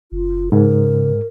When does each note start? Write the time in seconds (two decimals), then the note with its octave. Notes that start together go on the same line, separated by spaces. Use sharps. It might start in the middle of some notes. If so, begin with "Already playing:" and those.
0.12 F#1 F4
0.52 G#2 C#3 A#4